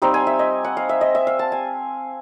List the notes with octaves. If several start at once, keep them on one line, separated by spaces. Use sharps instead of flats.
G3 C4 D#4 F5
G#5
E5
D#5
F#5
F5
E5
D#5
E5
F5
A5
G#5